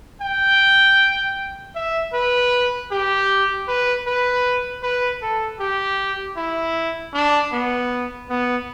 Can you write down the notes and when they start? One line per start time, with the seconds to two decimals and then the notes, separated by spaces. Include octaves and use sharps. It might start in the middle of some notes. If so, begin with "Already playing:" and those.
0.22 G5
1.76 E5
2.14 B4
2.92 G4
3.68 B4
4.07 B4
4.83 B4
5.22 A4
5.60 G4
6.37 E4
7.14 D4
7.52 B3
8.30 B3